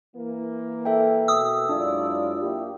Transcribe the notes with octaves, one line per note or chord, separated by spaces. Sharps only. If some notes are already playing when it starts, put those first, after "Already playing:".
E3 A#3
A4 E5 G5
B2 D#6 E6
F#2 F#3 G#3 D4 E4 F4 D5
A#3 E4 G4